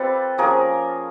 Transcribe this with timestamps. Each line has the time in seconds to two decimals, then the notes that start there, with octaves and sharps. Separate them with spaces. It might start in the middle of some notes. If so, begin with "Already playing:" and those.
Already playing: G3 C4 F4 A4 B4
0.38 F3 A#3 C#4 G#4 A#4